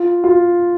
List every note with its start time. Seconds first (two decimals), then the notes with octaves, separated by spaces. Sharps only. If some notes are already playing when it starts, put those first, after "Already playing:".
Already playing: F4
0.24 F4